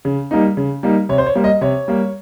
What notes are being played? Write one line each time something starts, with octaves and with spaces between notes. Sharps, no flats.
C#3
G3 A#3 D#4
C#3
G3 A#3 D#4
C3 C#5
C5
C#5
G3 A#3
D#5
C3 C#5
G3 A#3